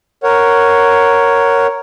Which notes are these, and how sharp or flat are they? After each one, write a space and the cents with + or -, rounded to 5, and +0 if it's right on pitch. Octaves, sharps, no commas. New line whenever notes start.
A#4 +0 C#5 +0 F#5 +0